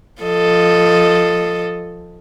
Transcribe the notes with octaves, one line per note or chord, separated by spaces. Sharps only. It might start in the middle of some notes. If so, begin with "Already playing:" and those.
F3 A4 D#5